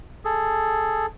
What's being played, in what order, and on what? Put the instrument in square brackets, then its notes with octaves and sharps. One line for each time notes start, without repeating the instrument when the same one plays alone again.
[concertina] G#4 A4